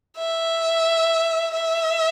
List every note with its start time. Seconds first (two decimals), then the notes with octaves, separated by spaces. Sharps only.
0.17 E5
1.54 E5